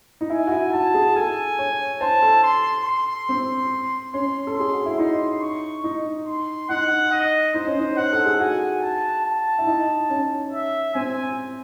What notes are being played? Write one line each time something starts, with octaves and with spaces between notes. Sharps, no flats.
D#4
E4 G#5
F#4
E4
F#4 A5
G#4
A4 G#5
C#5
C5 A5
A4
C6
C6
C4
C#4 C6
A4
G#4 C6
F#4
E4
D#4 C6
C#6
D#4
C6
D#4 F#5
D#5
D#4 C5
C#4
D#4
C5 F#5
A4
G#4
F#4 G#5
A5
A5
E4
D#4
C#4
E5
C4 G#5